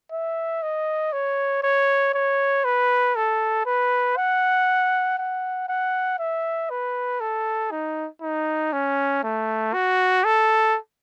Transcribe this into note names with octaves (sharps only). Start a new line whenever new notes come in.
E5
D#5
C#5
C#5
C#5
B4
A4
B4
F#5
F#5
F#5
E5
B4
A4
D#4
D#4
C#4
A3
F#4
A4